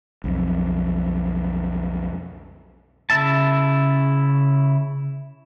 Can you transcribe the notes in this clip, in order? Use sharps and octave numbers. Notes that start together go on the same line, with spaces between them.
B1 F2
C#3 E4 E5 A5